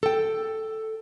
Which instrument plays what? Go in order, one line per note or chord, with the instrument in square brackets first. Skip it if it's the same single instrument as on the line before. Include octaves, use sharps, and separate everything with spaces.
[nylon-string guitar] A4 G5